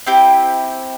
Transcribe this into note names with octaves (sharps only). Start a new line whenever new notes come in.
C4 E4 G4